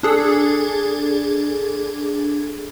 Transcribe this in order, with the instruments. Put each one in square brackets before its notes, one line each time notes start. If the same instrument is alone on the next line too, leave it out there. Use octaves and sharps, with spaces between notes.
[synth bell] D4 G#4 A4